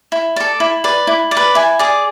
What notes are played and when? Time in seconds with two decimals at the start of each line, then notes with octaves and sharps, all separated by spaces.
0.12 E4
0.36 A4 D5
0.60 E4
0.84 B4 D5
1.07 E4
1.31 D5
1.37 B4
1.55 E4 G#5
1.79 G#4 D5